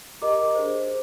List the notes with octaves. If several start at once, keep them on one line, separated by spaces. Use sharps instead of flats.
G4 A#4 D#5 A#5 D6
D4 G#4 C5